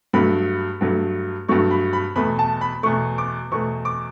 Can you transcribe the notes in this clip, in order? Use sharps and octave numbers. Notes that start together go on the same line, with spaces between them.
G2 F#3 A3 B5
G2 F#3 A3
G2 F#3 A3 C#6
B5
B5
E2 B2 A3 B5
A5
B5
E2 B2 A3 C#6
D6
E2 B2 A3 C#6
D6